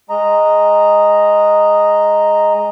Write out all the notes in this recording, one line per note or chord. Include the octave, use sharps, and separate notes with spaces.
G#3 D#5 A#5